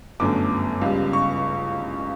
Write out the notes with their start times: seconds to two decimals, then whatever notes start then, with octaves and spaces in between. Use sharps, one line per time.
0.20 G1 F#2 D3 A3 D6
0.81 C#2 C#3 G3
1.13 C#6